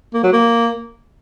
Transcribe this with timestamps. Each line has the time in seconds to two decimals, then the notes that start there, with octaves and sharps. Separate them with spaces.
0.14 A#3
0.23 F#3
0.33 A#3